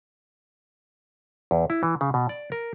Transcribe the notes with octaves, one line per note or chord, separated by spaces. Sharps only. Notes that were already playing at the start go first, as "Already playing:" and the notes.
E2
E4
E3
C#3
B2
D5
A#4